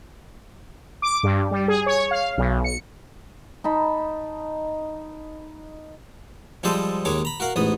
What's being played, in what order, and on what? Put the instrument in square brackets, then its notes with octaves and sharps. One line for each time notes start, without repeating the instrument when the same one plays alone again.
[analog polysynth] D6
G2
G3
G#4
C#5
F5
B1
C#7
[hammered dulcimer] D#4 A5 B5
[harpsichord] F3 G3 G#3 A4 C5 D#5
D#2 D#3 G#3 C#5 D6
A#5 B5
F#4 A#4 F5 F#5
A1 G#2 B3 D#6